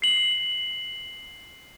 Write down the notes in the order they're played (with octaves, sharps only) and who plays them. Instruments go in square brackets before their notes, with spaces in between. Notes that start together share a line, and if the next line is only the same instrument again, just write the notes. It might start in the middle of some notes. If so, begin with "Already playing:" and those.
[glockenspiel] C7 F#7